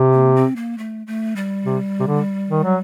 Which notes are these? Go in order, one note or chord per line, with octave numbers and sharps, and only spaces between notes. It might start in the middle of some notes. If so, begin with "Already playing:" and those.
Already playing: C3
A#3
C4
A#3
A3
A3
G3
C3
C3
D3
D#3
F#3